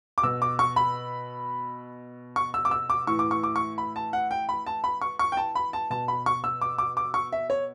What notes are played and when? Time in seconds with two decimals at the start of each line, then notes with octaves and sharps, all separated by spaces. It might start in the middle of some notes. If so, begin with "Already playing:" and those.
0.18 D6
0.23 B2 E6
0.42 D6
0.59 C#6
0.76 B5
2.36 C#6
2.54 E6
2.65 D6
2.71 E6
2.90 D6
3.07 A2 E3 C#6
3.19 D6
3.31 C#6
3.43 D6
3.56 C#6
3.78 B5
3.96 A5
4.13 F#5
4.31 G5
4.49 B5
4.66 A5
4.84 B5
5.01 C#6
5.19 C#6
5.32 G5
5.37 A5
5.55 B5
5.73 A5
5.90 B2 A5
6.08 B5
6.26 C#6
6.44 E6
6.61 D6
6.78 D6
6.97 D6
7.14 C#6
7.32 E5
7.50 C#5